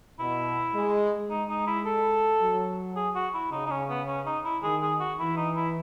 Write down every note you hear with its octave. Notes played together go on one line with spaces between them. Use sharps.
B2 E4
G#3
G#3 D#4
D#4
E4
A4
F#3
G#4
F#4
E4
C#3 D#4
D#4
C#4
B3
C#4
D#4
E4
D#3 G#4
G#4
F#4
E3 E4
D#4
E4